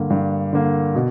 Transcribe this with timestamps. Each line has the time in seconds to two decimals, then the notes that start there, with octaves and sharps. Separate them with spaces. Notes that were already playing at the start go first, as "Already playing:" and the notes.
Already playing: G2 D3 A#3
0.10 G2
0.53 D3 A#3
0.95 B2